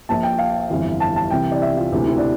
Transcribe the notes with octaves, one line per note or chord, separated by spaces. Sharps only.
A#1 A#2 A5
G5
F5
G1 F2 E3
A5
A5
C2 C3 E3 G5
D5
E5
F4
E1 D2 C3 E3 G4
E4
D4